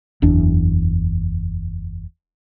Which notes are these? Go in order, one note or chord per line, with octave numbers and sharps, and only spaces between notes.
F#1 E2 D4